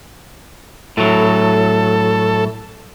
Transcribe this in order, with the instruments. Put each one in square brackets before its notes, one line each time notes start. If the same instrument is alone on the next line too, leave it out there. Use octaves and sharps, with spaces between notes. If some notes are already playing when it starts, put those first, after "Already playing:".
[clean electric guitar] A2 F#3 [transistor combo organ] A4